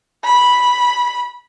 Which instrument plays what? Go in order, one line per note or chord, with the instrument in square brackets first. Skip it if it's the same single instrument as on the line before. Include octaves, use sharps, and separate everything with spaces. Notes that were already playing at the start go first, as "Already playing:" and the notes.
[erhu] B5